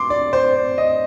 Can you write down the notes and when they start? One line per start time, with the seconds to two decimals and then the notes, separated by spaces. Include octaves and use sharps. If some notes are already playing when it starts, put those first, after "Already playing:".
Already playing: C6 D6
0.10 D5
0.33 C5
0.55 D5
0.78 D#5